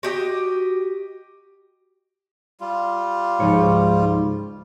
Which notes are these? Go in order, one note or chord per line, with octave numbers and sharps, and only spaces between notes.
F#4 G4 D#5
G3 F4
C#2 G#2 F3 C#5